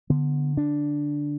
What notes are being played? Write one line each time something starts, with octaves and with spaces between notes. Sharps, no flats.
D3 B3
D3 D4